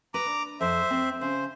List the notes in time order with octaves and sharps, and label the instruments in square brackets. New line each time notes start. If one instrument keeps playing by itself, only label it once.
[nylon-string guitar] B4 [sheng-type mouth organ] A#5 D6
[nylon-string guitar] D4
[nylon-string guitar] F2 [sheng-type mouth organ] C5 E5
[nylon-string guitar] C4
[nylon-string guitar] C#3 [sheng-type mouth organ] C5